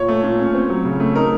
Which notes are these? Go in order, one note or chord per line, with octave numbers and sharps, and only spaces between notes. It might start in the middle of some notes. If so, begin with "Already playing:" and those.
Already playing: A#2 C#5
A3
A#2
C#4
C4
F#3
C#3
A3
D#4 A#4